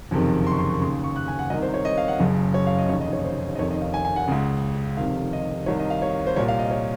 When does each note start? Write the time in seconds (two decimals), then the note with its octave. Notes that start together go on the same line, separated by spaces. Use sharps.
0.11 F#1 F2 C3 D#3
0.47 C6
0.52 C#6
0.58 C6
0.69 C#6
0.82 C#3 C6
0.85 D#2
1.04 C#6
1.16 F#6
1.28 G#5
1.39 F#5
1.50 C2 C3 D#3 D#5
1.62 C5
1.74 C#5
1.85 D#5
1.97 F5
2.08 F#5
2.20 F#1 F#2 C#3
2.54 C#5
2.67 F5
2.78 D#5
2.89 F1 D#2 C#3 C#5
3.01 D#5
3.13 C#5
3.24 C5
3.55 D#5
3.58 F1 F2 D#3 C#5
3.71 D#5
3.81 F5
3.94 G#5
4.05 G#5
4.16 F#5
4.28 C#2 C#3
4.97 F1 F2 C3 D#3 F5
5.33 D#5
5.66 C2 C3 D#3 C#5
5.79 D#5
5.90 F5
6.02 C#5
6.27 C5
6.36 C2 A#2 C#5
6.48 F5
6.59 D#5
6.71 C#5